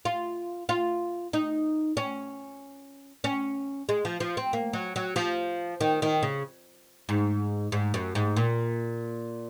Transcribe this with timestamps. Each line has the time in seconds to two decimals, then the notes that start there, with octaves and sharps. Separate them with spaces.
0.05 F4
0.69 F4
1.33 D#4
1.97 C#4
3.24 C#4
3.89 G#3
4.05 F3
4.20 F3
4.37 C4
4.53 A#3
4.73 F#3
4.96 F#3
5.16 F3
5.81 D#3
6.02 D#3
6.23 C#3
7.09 G#2
7.72 G#2
7.94 F#2
8.15 G#2
8.37 A#2